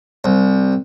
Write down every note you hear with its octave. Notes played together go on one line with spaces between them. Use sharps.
C2